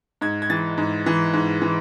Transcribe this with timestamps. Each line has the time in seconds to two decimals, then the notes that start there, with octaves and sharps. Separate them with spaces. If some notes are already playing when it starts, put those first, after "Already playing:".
0.21 G#2 G#6
0.42 G#6
0.50 E3 A6
0.78 G#2
1.06 E3
1.33 G#2
1.62 E3